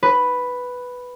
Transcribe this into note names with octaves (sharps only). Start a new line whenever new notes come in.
B4